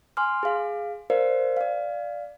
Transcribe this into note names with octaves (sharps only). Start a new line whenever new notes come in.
G#5 C6 D6 F6
G#4 F5
A#4 C5 D5 F5
D5 F5